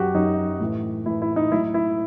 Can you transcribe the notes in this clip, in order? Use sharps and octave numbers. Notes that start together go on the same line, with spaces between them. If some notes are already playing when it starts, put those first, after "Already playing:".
Already playing: F#2 F#3 F#4 G4
F#2 F#3 D#4
A2 E3
A2 E3 E4
E4
D#4
A2 F#3 E4
E4